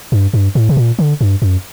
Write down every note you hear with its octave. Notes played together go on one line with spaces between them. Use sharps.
G2
G2
A2
C3
A#2
D3
G2
F#2